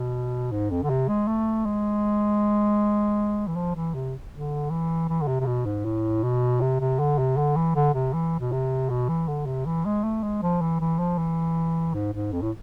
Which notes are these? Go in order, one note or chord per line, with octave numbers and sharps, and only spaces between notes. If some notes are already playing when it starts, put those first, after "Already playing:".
Already playing: B2
G#2
F2
D3
C3
G#3
A3
G#3
E3
F3
E3
C3
D3
E3
E3
D3
C3
C3
B2
G#2
A2
B2
C3
C3
D3
C3
D3
E3
D3
C3
E3
B2
C3
B2
E3
D3
C3
E3
G#3
A3
G#3
F3
E3
E3
F3
E3
G#2
G#2
F2
A2